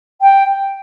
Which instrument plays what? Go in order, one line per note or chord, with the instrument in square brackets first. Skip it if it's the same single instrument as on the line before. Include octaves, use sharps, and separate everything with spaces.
[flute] G5